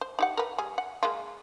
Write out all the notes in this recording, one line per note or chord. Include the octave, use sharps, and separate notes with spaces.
C5
D#4 G4 F#5
A#4 B4
G3 G#4
F#5
G#3 A#3 F4